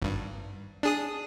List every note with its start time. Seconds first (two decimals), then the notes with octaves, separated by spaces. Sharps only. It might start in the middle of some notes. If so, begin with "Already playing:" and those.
0.02 G#1 G2
0.83 D4 G#4 D#6